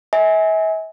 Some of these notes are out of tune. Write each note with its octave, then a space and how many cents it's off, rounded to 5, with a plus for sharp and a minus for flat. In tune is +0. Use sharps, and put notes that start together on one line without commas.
E5 -40 G#5 +0